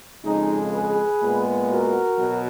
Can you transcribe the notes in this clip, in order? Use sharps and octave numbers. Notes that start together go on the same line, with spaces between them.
F2 C#3 G#3 D#4
G#4 B4
A#2 G#3 B3
F#4 A#4
B2 F#3